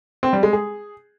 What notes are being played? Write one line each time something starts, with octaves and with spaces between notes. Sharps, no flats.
C4
G3
G#3
G#4